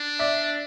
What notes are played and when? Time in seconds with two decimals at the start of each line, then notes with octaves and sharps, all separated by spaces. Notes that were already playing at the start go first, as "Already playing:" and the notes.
Already playing: D4
0.19 D5 E5